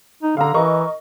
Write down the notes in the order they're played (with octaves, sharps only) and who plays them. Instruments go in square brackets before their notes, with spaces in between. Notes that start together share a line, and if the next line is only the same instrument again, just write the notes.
[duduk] D#4
[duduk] D3 [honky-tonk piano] F5 A#5
[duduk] E3 [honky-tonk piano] A#4 D#5 C#6